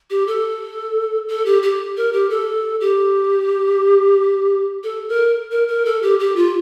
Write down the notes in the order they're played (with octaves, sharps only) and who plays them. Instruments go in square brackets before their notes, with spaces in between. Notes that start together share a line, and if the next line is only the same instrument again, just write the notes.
[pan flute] G4
A4
A4
G4
G4
A#4
G4
A4
G4
A4
A#4
A#4
A#4
A4
G4
G4
F4